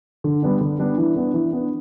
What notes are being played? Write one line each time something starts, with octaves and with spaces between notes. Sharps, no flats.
D3
G3 B3 D4
D3
G3 B3 D4
E3
B3 D4
E3
B3 D4